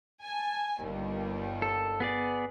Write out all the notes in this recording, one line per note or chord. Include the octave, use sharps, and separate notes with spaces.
G#5 A5
G1 D#2 G3
A4
B3 G#4 D5